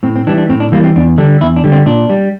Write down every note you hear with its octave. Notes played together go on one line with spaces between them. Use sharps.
A2 C4
C4
E3 G3 D4
D4
A2 C4
D4
E3 G3 A#3
C4
E2 D4
D3 G3 D4
E2 E4
D4
D3 G3
C4
A#2 D4
G3